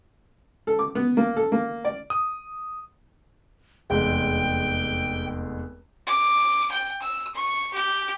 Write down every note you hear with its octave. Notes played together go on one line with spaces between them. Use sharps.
A4
D6
B3
A#3
A4
A#3
D5
D#6
F1 E2 G#3 G5
D6
G5
E6
C#6
G4